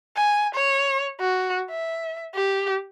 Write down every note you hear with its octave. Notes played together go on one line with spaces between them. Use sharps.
G#5
C#5
F#4
E5
G4